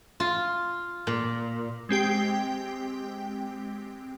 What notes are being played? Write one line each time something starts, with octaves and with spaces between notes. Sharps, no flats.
F4
A#2
G#3 C4 G4 G5